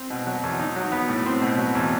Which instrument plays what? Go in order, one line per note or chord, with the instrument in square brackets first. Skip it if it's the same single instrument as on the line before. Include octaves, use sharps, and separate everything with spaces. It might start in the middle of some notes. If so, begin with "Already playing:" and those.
Already playing: [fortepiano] C4
B2
F#3
E2
D#4
F#3
B3
A2
C4
B2
F#3
E2